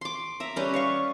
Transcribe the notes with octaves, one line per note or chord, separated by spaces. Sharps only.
C6 D6
E5 A#5
G3 C#4 G4 B4
C#5 F5 C#6